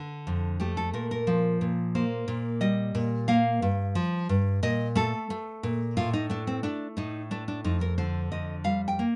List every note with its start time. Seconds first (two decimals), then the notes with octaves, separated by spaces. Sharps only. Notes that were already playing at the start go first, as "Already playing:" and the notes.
Already playing: D3
0.27 F2
0.60 A3 G4
0.77 A4
0.94 A#2 A#4
1.11 A#4
1.27 F3
1.61 A#2
1.95 A#3 C5
2.28 A#2
2.61 G3 D#5
2.95 A#2
3.28 A#3 F5
3.62 G2
3.95 F3
4.29 G2
4.63 A#2 D#5
4.95 A3 A4
5.30 A3
5.63 A#2
5.97 A2 F4
6.13 D#4
6.30 A3 D4
6.47 C4
6.63 A3 D4
6.97 A2 D#4
7.31 A3 D4
7.48 D4
7.64 F2 D#4
7.81 A#4
7.98 D3 C5
8.32 F2 D#5
8.64 G3 F5
8.88 G5
8.99 A#3